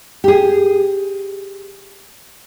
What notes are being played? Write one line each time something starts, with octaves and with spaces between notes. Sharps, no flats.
G4 G#4